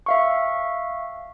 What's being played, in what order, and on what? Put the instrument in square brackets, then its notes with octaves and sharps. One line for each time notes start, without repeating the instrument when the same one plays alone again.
[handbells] E5 F5 C#6